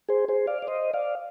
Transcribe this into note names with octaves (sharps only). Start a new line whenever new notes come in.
G#4 C5
G#4 C5
D5 F5
D5
C5 D#5
D5 F5